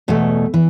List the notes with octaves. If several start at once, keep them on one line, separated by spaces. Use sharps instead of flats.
E2 B2 A3
E3